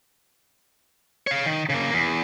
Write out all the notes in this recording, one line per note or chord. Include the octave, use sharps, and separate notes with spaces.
C#5 F5
D#3
C#3 A#3
E2